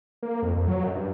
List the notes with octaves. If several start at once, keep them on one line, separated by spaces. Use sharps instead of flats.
A#3
F2
F2
F#3
F#2
G2